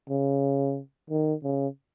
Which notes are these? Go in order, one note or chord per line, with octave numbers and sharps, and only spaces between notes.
C#3
D#3
C#3